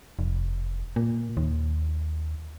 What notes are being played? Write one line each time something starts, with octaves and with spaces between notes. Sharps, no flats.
F1
A#2
D#2